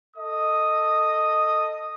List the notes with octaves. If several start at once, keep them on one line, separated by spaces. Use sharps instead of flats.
A4 D#5 D#6